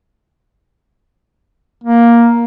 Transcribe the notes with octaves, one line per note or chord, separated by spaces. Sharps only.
A#3